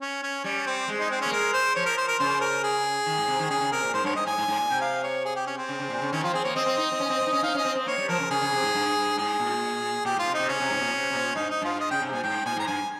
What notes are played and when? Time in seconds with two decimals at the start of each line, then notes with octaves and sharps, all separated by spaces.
0.01 C#4
0.23 C#4
0.44 G3 C#4
0.66 C4
0.88 G#3
1.00 D#4
1.10 C4
1.21 A#3 C#4
1.32 G#3 A#4
1.53 C5
1.75 F3 C#5
1.86 A#4
1.97 C5
2.08 A#4
2.19 C#3 C5
2.41 A#4
2.63 G#4
3.06 D#3
3.18 G#2
3.28 C3
3.39 D#3
3.50 C#3 G#4
3.61 C#3
3.72 C3 A#4
3.83 A#2
3.94 G#2 C5
4.04 G2 C#5
4.16 G#2 D#5
4.26 G#2 G#5
4.38 G#2
4.48 G#2
4.59 A#2
4.70 C3 G5
4.81 F5
5.04 C#5
5.25 G#4
5.36 G4
5.47 C#4
5.57 C4
5.69 C#3
5.80 C#3
5.90 A#2
6.02 C#3
6.12 D#3 C#4
6.23 F3 F4
6.33 C4 G#4
6.44 A#3 C#5
6.56 C4 D#5
6.66 C4
6.78 D#4
6.92 C4
7.00 C#4
7.10 C4
7.21 C4
7.27 D#4
7.33 C#4
7.43 D#4 F5
7.55 C#4 D#5
7.65 C4
7.75 C4
7.86 A#3 C#5
7.98 G3
8.08 F3 A#4
8.20 C#3
8.30 C#3 G#4
8.41 C#3
8.52 C3
8.63 G#2
8.74 G2
9.17 G#2 G#4
9.40 A#2
10.05 A#2 G4
10.17 G#2 F4
10.27 C3
10.34 D#4
10.39 C3
10.48 C#3 C#4
10.60 C3
10.70 G#2
10.76 C3
10.81 A#2
10.92 C3
11.10 C3
11.15 A#2
11.36 G2 D#4
11.50 D#4
11.62 G2 F4
11.80 D#5
11.91 C#3 G5
12.01 C3
12.12 A#2 G#5
12.23 G#2 G5
12.45 A#2 G#5
12.57 G#2 A#5
12.67 G2 G#5